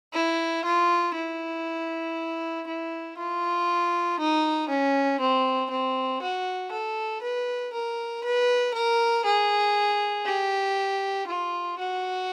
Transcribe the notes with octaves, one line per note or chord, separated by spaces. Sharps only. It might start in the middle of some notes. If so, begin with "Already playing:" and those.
E4
F4
E4
E4
F4
D#4
C#4
C4
C4
F#4
A4
B4
A#4
B4
A#4
G#4
G4
F4
F#4